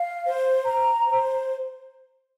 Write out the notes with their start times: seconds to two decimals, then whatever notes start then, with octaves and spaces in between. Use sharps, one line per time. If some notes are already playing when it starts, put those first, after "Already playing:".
Already playing: F5
0.26 C5
0.66 A#5
1.07 C5